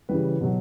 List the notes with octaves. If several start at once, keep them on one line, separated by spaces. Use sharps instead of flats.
C#3 E3 G3 B4
B2 F#3